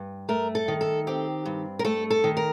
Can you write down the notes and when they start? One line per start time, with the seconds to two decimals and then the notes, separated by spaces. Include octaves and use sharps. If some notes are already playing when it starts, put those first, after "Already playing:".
Already playing: G2
0.29 A3 A#4
0.55 A4
0.68 D#3
0.81 A4
1.07 C4 G4
1.45 G2
1.79 A#4
1.85 A3 A4
2.10 A4
2.24 D#3
2.37 A#4